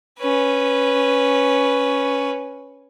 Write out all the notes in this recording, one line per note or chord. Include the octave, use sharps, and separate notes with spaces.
C#4 B4